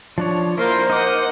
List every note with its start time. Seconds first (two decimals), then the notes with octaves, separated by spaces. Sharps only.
0.18 F3 D4 C#5
0.58 A#3 E4 F4 A#4 C5 C6
0.90 D#4 D#5 F#5 D6